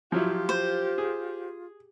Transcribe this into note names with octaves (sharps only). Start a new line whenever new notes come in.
F3 F#3 E4 F4 G4
C5
G#4